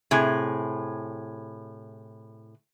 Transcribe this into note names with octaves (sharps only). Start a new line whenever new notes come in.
A2 C3 G#4